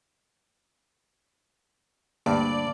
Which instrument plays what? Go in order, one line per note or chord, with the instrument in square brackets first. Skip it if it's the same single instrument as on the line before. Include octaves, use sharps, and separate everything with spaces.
[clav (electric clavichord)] D2 G2 [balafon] A#3 [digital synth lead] D5